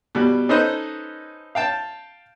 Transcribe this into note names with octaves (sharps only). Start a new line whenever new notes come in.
B2 G3
C#4 D#4 A4 B4 C5 D#5
F5 G5 A5